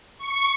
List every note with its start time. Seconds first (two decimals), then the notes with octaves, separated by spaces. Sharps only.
0.18 C#6